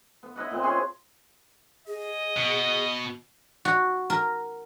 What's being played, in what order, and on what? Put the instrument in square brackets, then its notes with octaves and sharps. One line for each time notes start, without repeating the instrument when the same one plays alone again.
[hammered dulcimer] B3
E4 B4 D#5 F#5
A#2 C4
C#4 G#4 B4 C6
[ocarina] G#4 [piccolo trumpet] D#5
[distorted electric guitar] B2
[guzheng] F#4
A#4